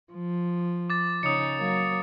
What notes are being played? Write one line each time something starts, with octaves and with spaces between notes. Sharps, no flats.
F3
D6 A6
C#3 C#4 D#4 D#6 C#7
F#3 A#3 C#5